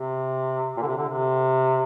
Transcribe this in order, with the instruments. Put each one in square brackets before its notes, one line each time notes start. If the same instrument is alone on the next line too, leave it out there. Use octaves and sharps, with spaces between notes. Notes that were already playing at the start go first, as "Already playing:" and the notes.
Already playing: [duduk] C3
A#2
D3
C3
D3
C3